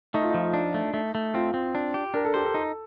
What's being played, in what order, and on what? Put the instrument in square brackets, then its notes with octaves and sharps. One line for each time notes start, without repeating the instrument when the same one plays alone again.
[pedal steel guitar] A3 [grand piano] D#4
[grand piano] F4
[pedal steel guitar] F3 [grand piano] D#4
[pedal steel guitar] D4
A3
A3
A3
[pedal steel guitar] C4 [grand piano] F4
[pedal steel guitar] C4
D4
G4
[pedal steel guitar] D4 [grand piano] A#4
[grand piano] A4
[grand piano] G4 [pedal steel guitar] C5
[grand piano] A4
[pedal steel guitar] D#4